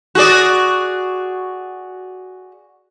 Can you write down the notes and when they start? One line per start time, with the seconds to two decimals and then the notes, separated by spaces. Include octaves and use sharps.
0.15 F#4 G#4 D5